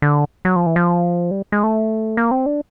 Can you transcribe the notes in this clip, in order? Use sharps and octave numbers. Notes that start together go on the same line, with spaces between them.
D3
F#3
F3
E3
F3
G3
G#3
A3
A#3
C4
D4